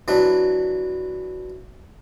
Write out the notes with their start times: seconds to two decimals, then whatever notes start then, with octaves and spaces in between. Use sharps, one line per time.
0.08 E3 F#3 D4